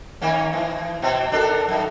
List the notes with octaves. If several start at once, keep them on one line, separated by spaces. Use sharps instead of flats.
D#3 A#3 C#4
E3
B2 C4
D4 A4 A#4
F#2 D#4